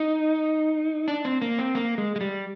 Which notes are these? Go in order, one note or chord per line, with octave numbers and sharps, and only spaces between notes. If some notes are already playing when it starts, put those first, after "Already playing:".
Already playing: D#4
D4
C4
A#3
C4
A#3
G#3
G#3
G3